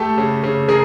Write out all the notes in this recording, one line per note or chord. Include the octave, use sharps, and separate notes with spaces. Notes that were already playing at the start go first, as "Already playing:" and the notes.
Already playing: A3 G4 A4
C#3
C#3
C#3 G#4 A#4